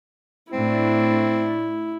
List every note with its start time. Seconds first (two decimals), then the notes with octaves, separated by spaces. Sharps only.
0.53 A2 A3 C4 D4 E4